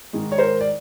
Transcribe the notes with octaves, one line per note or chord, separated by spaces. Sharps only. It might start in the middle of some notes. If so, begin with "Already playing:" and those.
G#2 D#3 G#3
C#5
A#4 C5
D5